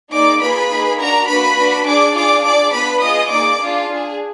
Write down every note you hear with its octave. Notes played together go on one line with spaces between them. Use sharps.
A#3 D#4 G#4 D5 D6
A#3 F4 G#4 B4 B5
A#3 D#4 G#4
D4 F#4 A#4 A#5
A#3 D4 F#4 B4 B5
D4 F#4
D4 G#4 D5 D6
D4 F4 G#4 D5 D6
D4 G#4 D5 D6
B3 D4 F4 B4 B5
B3 F4 G#4 D#5 D#6
A#3 D#4 G#4 D5 D6
D4 F4 G#4
D4 G#4